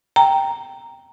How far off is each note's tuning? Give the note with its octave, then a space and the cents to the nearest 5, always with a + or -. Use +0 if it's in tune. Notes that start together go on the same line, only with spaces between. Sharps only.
G5 +0 A#5 +0